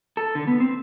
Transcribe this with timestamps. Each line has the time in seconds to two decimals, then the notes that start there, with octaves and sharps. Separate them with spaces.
0.17 A4
0.35 D3
0.47 B3
0.60 C4